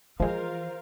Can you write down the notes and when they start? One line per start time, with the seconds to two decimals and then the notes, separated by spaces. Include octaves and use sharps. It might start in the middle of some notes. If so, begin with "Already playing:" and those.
0.20 E3 F3 G#3 F4 A#4 C5 F5